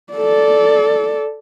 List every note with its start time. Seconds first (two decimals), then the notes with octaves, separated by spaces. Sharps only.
0.13 A4 D5